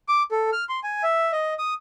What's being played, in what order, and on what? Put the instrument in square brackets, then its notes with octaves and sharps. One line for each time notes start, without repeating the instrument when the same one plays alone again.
[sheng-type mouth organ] D6
A4
F6
C6
G#5
E5
D#5
D#6